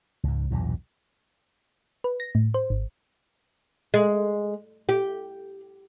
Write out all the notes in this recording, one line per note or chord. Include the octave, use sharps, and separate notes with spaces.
C#2 G#2
B1 E2 G2 A#2
B4
A#6
A2
C5
G#1
G#3
G4